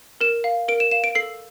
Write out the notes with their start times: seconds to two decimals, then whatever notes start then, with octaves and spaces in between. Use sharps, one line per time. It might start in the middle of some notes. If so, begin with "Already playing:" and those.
0.21 A#4 E7
0.44 F5
0.68 A#4 D7
0.80 E7
0.91 F5 E7
1.04 D7
1.15 A4 C7